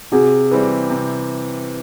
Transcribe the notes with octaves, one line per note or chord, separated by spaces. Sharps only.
C3 F#4 G#4
E3 G3 C4
C3